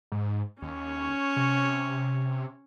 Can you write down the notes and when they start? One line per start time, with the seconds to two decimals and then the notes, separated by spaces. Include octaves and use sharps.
0.12 G#2
0.62 D#2 C#4 C#5
1.36 C3